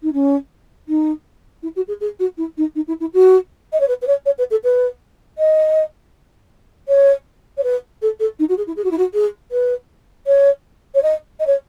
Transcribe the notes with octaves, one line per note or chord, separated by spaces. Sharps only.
D#4
C#4
D#4
E4
F#4
G#4
G#4
F#4
E4
D#4
D#4
E4
E4
F#4
D#5
C#5
B4
B4
C#5
C#5
B4
A4
B4
D#5
C#5
C#5
B4
A4
A4
D#4
F#4
G#4
E4
G#4
F#4
E4
F#4
G#4
B4
C#5
C#5
D#5
D#5
C#5